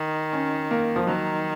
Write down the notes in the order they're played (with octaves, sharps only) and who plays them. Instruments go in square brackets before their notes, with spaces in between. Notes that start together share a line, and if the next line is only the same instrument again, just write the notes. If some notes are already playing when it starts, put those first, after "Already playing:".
Already playing: [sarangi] D#3 [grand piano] D#4
[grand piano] C#4
A#3
F3
[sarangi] D#3 [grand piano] F#3